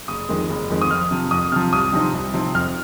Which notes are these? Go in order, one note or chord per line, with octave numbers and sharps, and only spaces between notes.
F#1 D#6
F2 D#3 G#3 C4
F#1
F2 D#3 G#3 C4
D#6
F2 F6
C3 F3
F2 D#6
C3 F3 F6
C2 D#6
C3 F3 C4 D#4
C2
C3 F3 C4 D#4
F2 F6